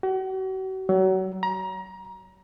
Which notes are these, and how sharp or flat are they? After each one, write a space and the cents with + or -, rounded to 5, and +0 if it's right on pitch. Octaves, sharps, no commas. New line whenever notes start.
F#4 +40
F#3 +30
A#5 +25